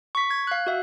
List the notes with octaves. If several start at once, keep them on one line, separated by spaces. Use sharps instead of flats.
C#6 B6
G#6
F5 F#6
F#4 E5